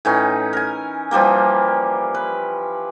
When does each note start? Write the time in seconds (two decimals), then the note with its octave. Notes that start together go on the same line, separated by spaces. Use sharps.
0.05 A2 E3 C#4 D#4
0.53 A#4 G#5
1.11 E3 F3 G3 A#3
2.15 B4